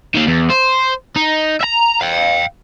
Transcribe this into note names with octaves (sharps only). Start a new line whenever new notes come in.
D#3 A#3
E2
C5
D#4
E5 A#5
F5 G5